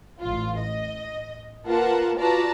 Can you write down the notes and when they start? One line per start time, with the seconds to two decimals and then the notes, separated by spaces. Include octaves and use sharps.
0.20 A1 F4
0.60 D#5
1.66 A#3 F4 A#4 B4 F#5 A5
2.19 F4 F#4 B4 D5 A5 A#5